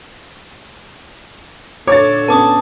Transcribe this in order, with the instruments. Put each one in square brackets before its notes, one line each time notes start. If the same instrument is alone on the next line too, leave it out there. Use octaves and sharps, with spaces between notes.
[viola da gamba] A#2 D3 A4 [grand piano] C#5 [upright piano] D6 G#6 A6
[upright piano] B3 C#4 [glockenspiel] A5 D6 D#6